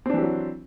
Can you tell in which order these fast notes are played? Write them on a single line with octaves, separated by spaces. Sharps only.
C4 D4 E3 G4 F#3